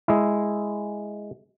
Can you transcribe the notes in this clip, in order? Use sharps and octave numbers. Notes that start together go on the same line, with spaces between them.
G#3 E4